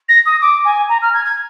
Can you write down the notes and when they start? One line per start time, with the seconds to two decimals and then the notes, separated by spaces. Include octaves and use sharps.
0.08 A#6
0.26 D#6
0.41 D6
0.65 G#5
0.89 A#5
1.02 F6
1.14 G#6
1.26 G#6